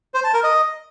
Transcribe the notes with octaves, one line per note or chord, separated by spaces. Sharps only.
C5
A5
A#4
D#5